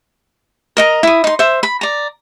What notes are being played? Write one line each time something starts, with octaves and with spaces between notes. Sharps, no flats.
A#4 D#5 A#5
E4 D#6
D#4 C6
C5 E5
B5
D5 A#5